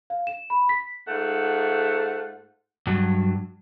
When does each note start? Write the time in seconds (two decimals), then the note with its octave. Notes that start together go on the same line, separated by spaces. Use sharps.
0.10 F5
0.27 E7
0.50 B5
0.69 B6
1.08 G#2 A3 F4 F#5
2.87 G2 F#3